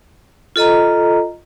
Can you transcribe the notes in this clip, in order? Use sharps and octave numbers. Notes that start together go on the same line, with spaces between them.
F4 A4 D#5 A#5